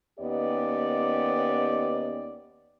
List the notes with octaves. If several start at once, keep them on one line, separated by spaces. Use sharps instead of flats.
D#2 B3 C#4 G4 D5 D#5